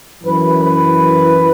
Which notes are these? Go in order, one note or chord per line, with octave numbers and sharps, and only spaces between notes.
F#2 E3 B4
B4